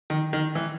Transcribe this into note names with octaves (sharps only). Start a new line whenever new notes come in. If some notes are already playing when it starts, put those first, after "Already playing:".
D#3
D#3
E3